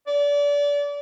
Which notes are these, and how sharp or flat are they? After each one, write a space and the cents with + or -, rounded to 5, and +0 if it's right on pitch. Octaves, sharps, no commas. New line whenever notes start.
D5 -30